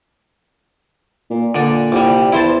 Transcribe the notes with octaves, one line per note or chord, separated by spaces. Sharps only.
A#2
A#2 D3 D4
C2 G3
E2 E4 C5 A5